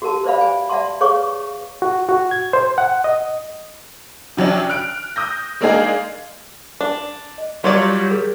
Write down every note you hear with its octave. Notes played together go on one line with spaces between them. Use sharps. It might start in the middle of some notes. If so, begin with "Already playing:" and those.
F#4 G4 A#4 A5
B4 C5 D5 E5 F5 B5
D5 G#5
D5 E5 F#5 A5 C6
G#4 B4 C#5 F5 C#6 D6
F#4
F#4
G#6
C5
F#5
D#5
C3 F#3 C#4 D4
F6 F#6 D7
D#6 G6 A#6
G#3 A#3 D4 D#4 G#4 F5
D4
D#5
F#3 G3 F4 C#5 D5 C6
F#4 G#4 A#4